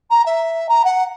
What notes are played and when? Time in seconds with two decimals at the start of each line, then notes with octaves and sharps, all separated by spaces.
0.10 A#5
0.25 E5
0.68 A#5
0.84 F#5